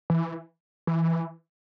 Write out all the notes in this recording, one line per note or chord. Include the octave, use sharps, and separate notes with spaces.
E3
E3